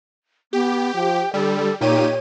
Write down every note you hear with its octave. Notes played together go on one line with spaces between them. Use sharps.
B3 G4
F3 G5
D3 G3 A4
A#2 D#4 G4 C#5 D#7